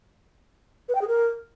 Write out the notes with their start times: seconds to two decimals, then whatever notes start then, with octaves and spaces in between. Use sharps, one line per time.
0.89 B4
0.95 G5
1.01 G#4
1.08 A#4